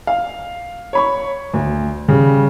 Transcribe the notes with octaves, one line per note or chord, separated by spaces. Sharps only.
F5
C#5 B5 C#6
D2
C#3 G3